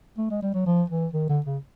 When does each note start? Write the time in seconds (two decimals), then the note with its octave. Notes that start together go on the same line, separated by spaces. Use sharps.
0.18 A3
0.30 G#3
0.42 G3
0.54 F#3
0.66 F3
0.90 E3
1.13 D#3
1.29 D3
1.46 C#3